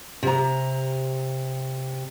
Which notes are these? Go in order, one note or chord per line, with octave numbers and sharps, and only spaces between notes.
C3 A#5